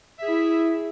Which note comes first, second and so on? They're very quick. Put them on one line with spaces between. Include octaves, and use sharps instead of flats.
E5 G#4 E4